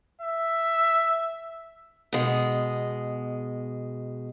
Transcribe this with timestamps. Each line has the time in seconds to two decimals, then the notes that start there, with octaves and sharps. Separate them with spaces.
0.21 E5
2.13 B2 G#3